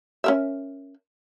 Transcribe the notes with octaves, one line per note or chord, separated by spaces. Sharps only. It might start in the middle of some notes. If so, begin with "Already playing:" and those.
C#4 A#4 E5